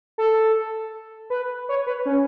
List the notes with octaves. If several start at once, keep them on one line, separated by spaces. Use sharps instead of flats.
A4
B4
C#5
B4
C#4